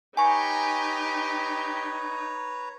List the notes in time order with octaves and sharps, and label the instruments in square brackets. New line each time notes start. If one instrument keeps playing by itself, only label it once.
[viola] D#4 [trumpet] G4 [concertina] B4 C#5 A#5 [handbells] G#5 C#6